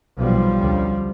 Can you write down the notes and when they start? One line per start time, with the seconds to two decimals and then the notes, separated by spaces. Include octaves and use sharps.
0.17 B1 B2 F3 G3
0.58 D2 C#3